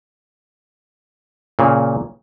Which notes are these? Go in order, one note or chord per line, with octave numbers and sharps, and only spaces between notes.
A#2 C#3 A#3